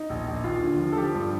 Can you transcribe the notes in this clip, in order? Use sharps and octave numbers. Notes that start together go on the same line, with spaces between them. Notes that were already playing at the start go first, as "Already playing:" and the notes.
Already playing: D#4
A#1
A#1
D#2 F4
D3
F3
A4
F3 G4
G2